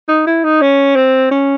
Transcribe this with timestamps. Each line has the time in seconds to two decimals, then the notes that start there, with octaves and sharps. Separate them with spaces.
0.09 D#4
0.26 E4
0.44 D#4
0.61 C#4
0.96 C4
1.31 C#4